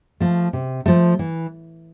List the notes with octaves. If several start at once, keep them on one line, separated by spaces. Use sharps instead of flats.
F3 A3
C3
F3 A3
E3